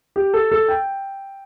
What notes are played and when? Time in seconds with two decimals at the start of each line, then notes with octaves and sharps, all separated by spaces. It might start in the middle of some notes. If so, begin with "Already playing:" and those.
0.16 G4
0.34 A4
0.51 A4
0.68 G5